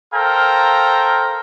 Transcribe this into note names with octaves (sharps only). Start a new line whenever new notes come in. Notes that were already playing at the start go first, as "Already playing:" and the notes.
A4 A#4 C5 F5 G5 A#5